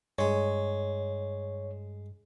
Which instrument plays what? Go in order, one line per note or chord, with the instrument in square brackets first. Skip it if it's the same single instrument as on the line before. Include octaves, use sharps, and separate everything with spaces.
[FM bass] G2 [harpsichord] G#3 [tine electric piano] C#5